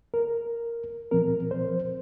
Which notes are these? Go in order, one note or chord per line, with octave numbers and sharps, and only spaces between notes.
A#4
A#2 F3 C4 A#4
C5